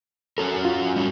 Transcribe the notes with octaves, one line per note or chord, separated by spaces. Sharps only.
C#4 F#4 A4 A#4
F4
G3 C#4 F#4